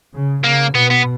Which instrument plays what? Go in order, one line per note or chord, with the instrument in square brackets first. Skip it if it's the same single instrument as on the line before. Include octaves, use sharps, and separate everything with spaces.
[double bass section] C#3
[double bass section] C#3 [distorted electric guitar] A#3
[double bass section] B2 [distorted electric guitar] B3
[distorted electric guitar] B3